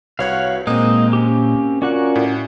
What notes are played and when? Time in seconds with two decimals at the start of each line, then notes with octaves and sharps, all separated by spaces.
0.19 C2 F#4 B4 C#5 F5 F#5 G#6
0.67 A#2 G#3 A#3 C4 D#4 D#5
1.13 C#4 G4
1.82 C#4 F4 F#4 A#4 D5 F#5
2.16 A2